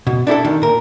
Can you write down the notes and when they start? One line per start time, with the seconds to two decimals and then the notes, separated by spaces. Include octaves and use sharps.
0.07 B2
0.27 D4 E4 G4 A4
0.45 D#3
0.62 A#2 A#4